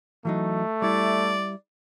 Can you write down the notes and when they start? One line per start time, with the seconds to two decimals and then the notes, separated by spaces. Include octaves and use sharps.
0.25 E3 F#3 A3 D#4
0.82 G3 E4 D5